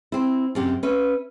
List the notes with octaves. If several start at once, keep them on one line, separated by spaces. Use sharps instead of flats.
C4 E4
F#2 C3 G4
C#4 B4 E5